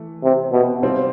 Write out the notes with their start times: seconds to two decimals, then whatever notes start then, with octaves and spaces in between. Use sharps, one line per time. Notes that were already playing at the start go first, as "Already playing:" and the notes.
Already playing: E3 A3
0.23 C3
0.52 B2
0.83 C3 G3 C4 F4